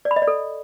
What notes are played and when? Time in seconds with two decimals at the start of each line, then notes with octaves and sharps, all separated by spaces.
0.05 D5
0.11 B5
0.16 D#5
0.22 D5
0.28 A4